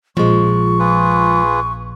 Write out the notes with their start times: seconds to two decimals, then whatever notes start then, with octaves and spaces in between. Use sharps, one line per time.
0.17 A#1 F3 G#3 C#6
0.79 F4 G#4 B4